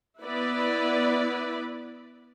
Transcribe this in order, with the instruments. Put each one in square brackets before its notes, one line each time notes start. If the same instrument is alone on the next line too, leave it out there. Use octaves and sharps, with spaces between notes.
[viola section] B3 E4 B4 D5